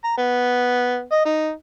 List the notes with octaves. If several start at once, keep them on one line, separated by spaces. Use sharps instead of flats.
A#5
B3
D#5
D#4